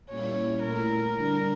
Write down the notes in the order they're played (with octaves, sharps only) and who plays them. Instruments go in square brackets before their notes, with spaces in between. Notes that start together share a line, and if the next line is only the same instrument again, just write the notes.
[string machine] A#2 G3 A#3 C#4 E4 [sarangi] C#5
[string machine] A#2 A3 E4 [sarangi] A#4
[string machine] D3 G3 D4